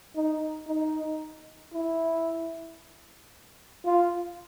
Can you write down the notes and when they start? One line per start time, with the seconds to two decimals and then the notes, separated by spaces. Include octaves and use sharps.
0.16 D#4
0.68 D#4
1.74 E4
3.85 F4